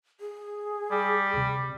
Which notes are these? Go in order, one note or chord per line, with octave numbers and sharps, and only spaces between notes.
G#4
G3
D2 C3